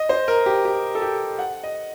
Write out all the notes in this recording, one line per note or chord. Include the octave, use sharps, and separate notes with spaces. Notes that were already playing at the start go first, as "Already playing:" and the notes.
Already playing: D#5
C5
A#4
G4
G4
A4
G4
F#5
D#5